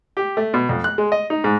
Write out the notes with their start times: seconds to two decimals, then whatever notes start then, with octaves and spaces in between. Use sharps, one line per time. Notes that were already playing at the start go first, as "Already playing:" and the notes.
0.17 G4
0.37 A3
0.54 B2
0.69 F2
0.84 F#6
0.98 G#3
1.12 D#5
1.30 D#4
1.44 G#2